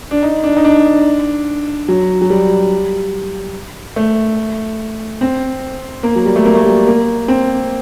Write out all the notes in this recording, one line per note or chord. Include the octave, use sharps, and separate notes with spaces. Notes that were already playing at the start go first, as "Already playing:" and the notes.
D4
D#4
D4
D#4
D4
F#3
F#3
G3
A3
C4
A#3
F#3
G3
A3
A#3
A3
G3
A#3
C4